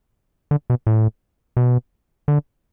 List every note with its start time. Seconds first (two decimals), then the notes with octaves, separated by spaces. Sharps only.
0.51 D3
0.70 B2
0.87 A2
1.57 B2
2.28 D3